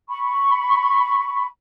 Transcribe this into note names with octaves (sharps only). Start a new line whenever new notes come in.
B5 C#6